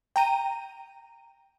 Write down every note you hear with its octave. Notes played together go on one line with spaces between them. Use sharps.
G5 A#5 D#7